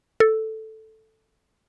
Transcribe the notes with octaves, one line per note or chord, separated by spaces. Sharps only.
A4